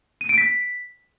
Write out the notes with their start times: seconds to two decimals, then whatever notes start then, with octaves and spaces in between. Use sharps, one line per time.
0.21 D#7
0.29 D7
0.38 B6